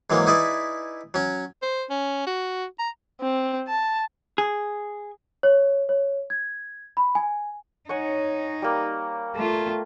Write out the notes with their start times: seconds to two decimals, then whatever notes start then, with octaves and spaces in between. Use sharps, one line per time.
0.10 G#2 E3 F#3 G#3 A#3
0.27 D#4 E4 G#4 B4 D5 E5
1.14 F#3 C#4
1.62 C5
1.90 C#4
2.27 F#4
2.79 A#5
3.22 C4
3.68 A5
4.38 G#4
5.43 C#5
5.89 C#5
6.30 G#6
6.97 B5
7.15 G#5
7.89 D#4 C#5 F#5 G#5
8.62 G3 A#3
9.36 A3 F4